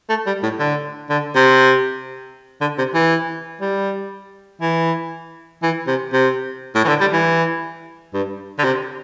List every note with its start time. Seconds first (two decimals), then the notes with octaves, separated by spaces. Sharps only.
0.09 A3
0.27 G3
0.43 A2
0.59 D3
1.10 D3
1.36 C3
2.61 D3
2.78 C3
2.94 E3
3.61 G3
4.62 E3
5.63 E3
5.87 C3
6.13 C3
6.75 A2
6.85 E3
6.88 D3
7.01 G3
7.13 E3
8.14 G2
8.59 D3
8.64 C3